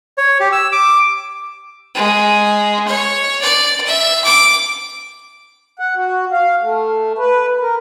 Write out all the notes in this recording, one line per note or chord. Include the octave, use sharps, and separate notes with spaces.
C#5
G4
E6
D6
G#3
C#5
D5
E5
D6
F#5
F#4
F5
A3
B4
A#4